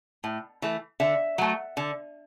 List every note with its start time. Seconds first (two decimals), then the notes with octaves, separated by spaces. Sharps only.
0.24 A2
0.62 E3 A3
1.00 D3 E5
1.38 F#3 A3
1.77 D3